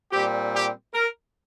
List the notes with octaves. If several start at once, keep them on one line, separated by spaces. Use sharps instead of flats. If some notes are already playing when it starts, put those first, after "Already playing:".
A#2 G3 C4 G4
G4
A#4